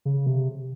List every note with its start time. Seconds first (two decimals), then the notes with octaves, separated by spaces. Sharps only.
0.05 C#3
0.26 C3